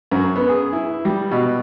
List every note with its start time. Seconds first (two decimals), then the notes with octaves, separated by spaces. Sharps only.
0.11 F#2
0.36 B3
0.49 G#4
0.73 E4
1.05 G3
1.31 B2